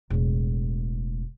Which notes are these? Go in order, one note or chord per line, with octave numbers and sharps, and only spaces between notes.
E1 A2